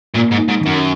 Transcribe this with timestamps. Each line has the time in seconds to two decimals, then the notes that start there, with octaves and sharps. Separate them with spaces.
0.16 A#2 A#3
0.32 G#2
0.38 D#4
0.49 G#2
0.61 D#3
0.66 F#2